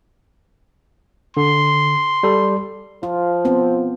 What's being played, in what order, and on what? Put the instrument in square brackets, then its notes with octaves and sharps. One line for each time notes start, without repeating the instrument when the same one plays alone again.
[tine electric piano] D3 [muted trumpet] C6
[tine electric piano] G3 A4
[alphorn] F3 [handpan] F4
[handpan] B3 C4